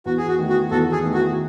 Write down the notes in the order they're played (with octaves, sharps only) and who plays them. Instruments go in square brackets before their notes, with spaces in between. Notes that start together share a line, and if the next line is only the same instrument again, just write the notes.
[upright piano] E2 [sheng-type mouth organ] F#4
[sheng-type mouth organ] G#4
F#4
[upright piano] D#3 A3
[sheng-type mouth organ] F#4
[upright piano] E2 [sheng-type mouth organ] F#4 A4
[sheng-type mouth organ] G#4
[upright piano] D#3 A3
[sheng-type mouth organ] F#4